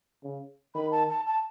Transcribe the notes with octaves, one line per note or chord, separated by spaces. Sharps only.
C#3
D#3 B5
A5
A5
A5